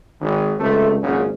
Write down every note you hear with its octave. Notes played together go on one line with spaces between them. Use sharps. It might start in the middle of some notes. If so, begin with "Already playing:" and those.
G#1 D#3
C#2 C3 A3
G#1 F#2 A#2 C#3